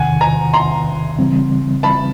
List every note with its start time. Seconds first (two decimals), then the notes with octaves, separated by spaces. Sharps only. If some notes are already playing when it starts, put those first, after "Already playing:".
Already playing: E2 C3 D#3 F#5 G#5
0.21 G#5 A#5
0.53 A#5 C6
1.19 C#3 E3 G3 C4
1.83 A5 B5